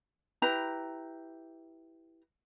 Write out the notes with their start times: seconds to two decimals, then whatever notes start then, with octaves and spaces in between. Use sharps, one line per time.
0.42 E4 G4 B4 A#5